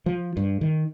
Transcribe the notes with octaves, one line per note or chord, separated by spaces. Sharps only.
F3
G2
D#3